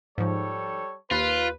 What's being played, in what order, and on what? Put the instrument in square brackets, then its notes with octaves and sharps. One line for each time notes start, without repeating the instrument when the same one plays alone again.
[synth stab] G#2 F3 [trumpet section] G3 A4 C#5
[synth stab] D#2 [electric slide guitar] F4 [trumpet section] B4